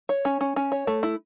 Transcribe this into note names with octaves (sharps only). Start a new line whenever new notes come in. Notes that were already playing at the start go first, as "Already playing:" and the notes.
C#5
C#4
C#4
C#4
C#5
A3
E4